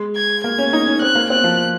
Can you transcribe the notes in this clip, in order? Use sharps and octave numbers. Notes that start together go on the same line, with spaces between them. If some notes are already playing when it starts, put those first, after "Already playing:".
Already playing: G#3
G#6
A#3 G#6
C#4
D#4
C#4
C4 F#6
A#3
C4 F#6
F3